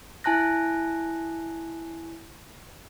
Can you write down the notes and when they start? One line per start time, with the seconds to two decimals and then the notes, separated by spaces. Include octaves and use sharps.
0.24 E4 G#5 A5 F#6 A#6